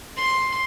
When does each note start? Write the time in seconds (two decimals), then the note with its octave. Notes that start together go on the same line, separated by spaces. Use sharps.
0.16 C6